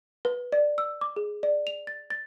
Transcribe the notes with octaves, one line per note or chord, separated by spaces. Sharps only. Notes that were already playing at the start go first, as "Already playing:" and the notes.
B4
D5
E6
D6
G#4
D5
F7
A6
A6